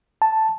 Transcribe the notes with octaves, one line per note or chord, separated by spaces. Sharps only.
A5